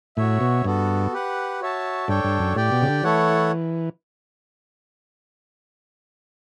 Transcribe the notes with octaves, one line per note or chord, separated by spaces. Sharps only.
A2 F#4 C#5 E5
B2
G2 B3 F#4 A4
G4 B4 F#5
F#4 C#5 E5 A5
G2 D4 A4 C#5 G5
G2
F#2
A2 G4 D5 G5
B2
C#3
D3
E3 A3 E4 A4 C#5 F#5